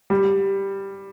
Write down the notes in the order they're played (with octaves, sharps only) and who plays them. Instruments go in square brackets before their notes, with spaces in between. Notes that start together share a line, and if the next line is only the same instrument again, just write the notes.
[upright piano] G3